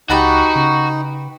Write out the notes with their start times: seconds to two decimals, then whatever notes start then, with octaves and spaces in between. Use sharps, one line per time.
0.10 C#2 D#4 F#4 G4 B4 A5
0.56 C#3